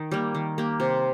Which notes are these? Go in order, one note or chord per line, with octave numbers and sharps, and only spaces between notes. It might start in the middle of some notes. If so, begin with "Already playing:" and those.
Already playing: D#3 D#4
G3 A#3
D#3
A#3 G4
C3